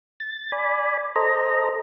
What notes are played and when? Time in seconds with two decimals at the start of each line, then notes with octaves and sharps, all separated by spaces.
0.20 A6
0.52 D5 G#5 B5
1.16 A4 C5 D#5 A#5